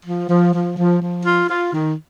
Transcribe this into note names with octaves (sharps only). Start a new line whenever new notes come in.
F3
F3
F3
F3
F3
F4
F4
D#3